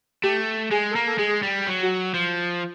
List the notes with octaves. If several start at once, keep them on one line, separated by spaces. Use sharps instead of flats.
A3 G4
G#3 G#4
A4
A#3 A#4
A4
G#3 G#4
G3
F#3
F#4
F3